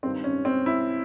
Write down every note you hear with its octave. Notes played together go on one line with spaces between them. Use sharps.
G2 D#3 C4
C#4
C4
E4